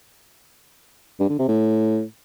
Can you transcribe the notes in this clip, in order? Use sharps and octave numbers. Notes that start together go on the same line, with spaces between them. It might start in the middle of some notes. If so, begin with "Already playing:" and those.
G2
D3
C3
A2